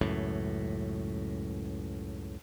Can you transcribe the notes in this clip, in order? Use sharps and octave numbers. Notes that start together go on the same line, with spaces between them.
C#2 F#2 A2